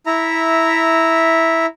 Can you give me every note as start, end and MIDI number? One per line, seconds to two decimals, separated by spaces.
0.06 1.66 64
0.06 1.66 76
0.06 1.66 82